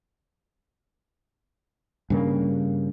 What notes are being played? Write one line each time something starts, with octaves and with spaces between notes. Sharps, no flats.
G2 C#3 A#3